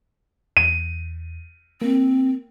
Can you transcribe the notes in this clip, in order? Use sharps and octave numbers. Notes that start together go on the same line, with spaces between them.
E2 D#7
A#3 C4